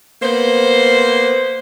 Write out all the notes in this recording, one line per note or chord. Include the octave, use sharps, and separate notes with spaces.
A#3 B3 C5